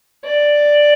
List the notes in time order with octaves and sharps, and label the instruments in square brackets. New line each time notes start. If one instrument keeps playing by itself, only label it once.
[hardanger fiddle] D5